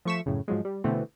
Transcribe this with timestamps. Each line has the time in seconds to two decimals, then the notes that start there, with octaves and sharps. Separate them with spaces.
0.05 F3 A3 C#6 B6 E7
0.26 F#2 A2 C#3
0.48 G#2 F3 F#3 G#3
0.65 G3
0.84 B2 D3 E3 A3 B3 C4